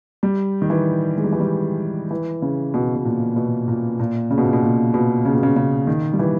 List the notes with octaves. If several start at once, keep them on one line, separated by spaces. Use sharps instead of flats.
G3
D#3
E3
G#3
G3
E3
G3
E3
C#3
B2
B2
A#2
B2
A#2
A#2
C#3
B2
A#2
B2
A#2
B2
C#3
B2
C#3
C#3
D#3
G3
E3